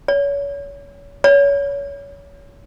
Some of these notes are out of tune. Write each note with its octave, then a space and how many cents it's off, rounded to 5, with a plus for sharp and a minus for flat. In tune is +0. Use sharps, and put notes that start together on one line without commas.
C#5 +30
C#5 +25